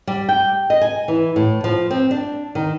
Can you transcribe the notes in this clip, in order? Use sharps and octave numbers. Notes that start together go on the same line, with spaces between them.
G3
G5
D#5
G#5
E3
A2
F3
C4
D4
D#3